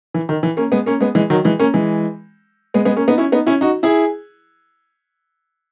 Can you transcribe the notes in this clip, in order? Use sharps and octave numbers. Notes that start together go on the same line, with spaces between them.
E3
D#3
E3
A#3 C#4
G#3 B3
A#3 C#4
G#3 B3
E3 G#3
D#3 F#3
E3 G#3
A#3 C#4
E3 G#3
G#3 B3
G#3 B3
A#3 C#4
B3 D#4
C#4 E4
B3 D#4
C#4 E4
D#4 F#4
E4 G#4